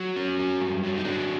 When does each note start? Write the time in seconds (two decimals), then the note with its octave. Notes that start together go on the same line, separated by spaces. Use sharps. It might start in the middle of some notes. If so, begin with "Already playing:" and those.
Already playing: F#3
0.16 C#4
0.39 F#3
0.61 G2
0.84 F#3
0.98 D#4
1.05 F#3 D4